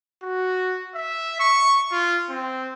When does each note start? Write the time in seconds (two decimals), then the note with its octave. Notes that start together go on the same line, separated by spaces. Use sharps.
0.23 F#4
0.95 E5
1.40 C#6
1.92 F4
2.30 C4